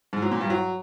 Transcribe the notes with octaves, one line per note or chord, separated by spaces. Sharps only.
G#2
F#3
A#2
G2
F#3